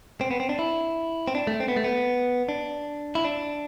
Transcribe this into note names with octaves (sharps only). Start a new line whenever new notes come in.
C4
B3
C4
D4
E4
C4
D4
A3
C4
B3
A3
B3
D4
E4
D4